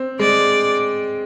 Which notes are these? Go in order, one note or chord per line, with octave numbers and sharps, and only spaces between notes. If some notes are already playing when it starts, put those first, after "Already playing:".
Already playing: C4
G#3 D5